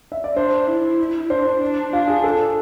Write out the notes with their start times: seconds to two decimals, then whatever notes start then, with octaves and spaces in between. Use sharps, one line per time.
0.12 E5
0.24 D5
0.36 D4 C5
0.67 E4
1.30 D4 C5
1.61 D4
1.93 D4 F4
2.08 G#4
2.24 A4